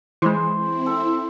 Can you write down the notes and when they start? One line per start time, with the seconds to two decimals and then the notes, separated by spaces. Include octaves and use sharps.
0.22 E3 G#3 C5
0.56 C4 E4
0.86 A4